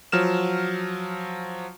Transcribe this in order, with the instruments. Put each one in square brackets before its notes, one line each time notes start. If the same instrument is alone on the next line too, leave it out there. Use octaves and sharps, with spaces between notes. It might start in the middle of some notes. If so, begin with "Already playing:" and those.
[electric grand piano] F3 F#3 F6 E7